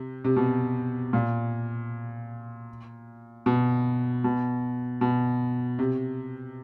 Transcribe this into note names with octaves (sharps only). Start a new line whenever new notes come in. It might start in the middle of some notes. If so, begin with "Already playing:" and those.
Already playing: C3
C3
B2
A#2
B2
B2
B2
C3